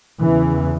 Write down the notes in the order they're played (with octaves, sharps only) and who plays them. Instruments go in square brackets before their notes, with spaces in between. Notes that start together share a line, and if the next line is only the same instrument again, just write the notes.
[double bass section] E2 C#3 E3